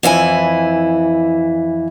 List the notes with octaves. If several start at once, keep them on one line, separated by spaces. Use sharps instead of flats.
F2 E3 E4 G#5